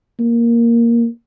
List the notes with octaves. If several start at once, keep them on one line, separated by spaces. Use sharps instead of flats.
A#3